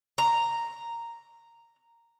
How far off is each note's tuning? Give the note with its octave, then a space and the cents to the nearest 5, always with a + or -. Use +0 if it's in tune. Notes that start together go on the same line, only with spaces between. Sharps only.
A#5 -5